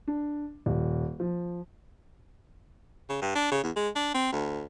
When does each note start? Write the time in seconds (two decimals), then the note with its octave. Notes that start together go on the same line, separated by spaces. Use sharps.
0.07 D4
0.66 D#1
1.20 F3
3.09 C#3
3.22 G2
3.35 D4
3.51 C#3
3.63 E2
3.76 G#3
3.96 D4
4.14 C4
4.33 D2